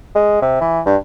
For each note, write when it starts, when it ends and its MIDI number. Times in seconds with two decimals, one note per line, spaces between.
0.15 0.41 56
0.42 0.56 48
0.61 0.80 52
0.86 0.96 43